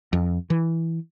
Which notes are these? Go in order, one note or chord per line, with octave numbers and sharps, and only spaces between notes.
F2
E3